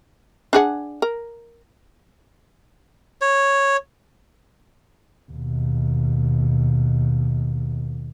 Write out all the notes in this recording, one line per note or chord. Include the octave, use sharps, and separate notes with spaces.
D4 G#4 F#5
A#4
C#5
D#2 B2